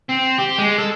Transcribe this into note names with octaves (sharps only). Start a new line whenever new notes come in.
C4
G4
G#3
A4